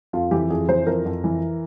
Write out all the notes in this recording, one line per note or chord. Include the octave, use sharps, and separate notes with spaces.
F2 F4
E3 G4
F2 G#4
E3 C5
F2 A#4
F2
E3